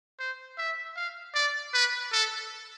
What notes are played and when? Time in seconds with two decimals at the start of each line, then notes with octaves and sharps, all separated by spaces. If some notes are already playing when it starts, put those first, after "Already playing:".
0.20 C5
0.58 E5
0.96 F5
1.35 D5
1.74 B4
2.13 A4